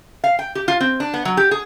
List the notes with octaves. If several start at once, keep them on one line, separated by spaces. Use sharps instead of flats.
F5
G5
G4
F4
C4
D4
B3
F#3
G4
G#4